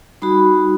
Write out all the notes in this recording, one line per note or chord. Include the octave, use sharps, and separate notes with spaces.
G3 D#4 F#4 B5